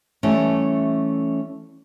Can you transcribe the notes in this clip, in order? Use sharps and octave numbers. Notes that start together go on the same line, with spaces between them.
E3 G3 A3 C#4